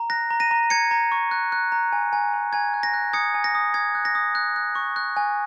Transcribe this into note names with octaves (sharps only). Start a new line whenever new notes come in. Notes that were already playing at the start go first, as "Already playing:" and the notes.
Already playing: A#5
F#6 A#6
A#5
A#6 D#7
A#5
A#5 G#6 C#7
A#5
C#6
F#6
F#6
A#5
G#5
G#5
G#5
G#5 G#6
F#6
A#6
F#6
D#6 G#6 C#7
G#5
A#6
D#6
D#6 G#6
F#6
A#6
D#6
F#6
F#6
C#6
F#6
G#5